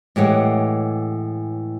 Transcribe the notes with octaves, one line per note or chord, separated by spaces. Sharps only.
A2 E3 G#3 G4 C#5 F#5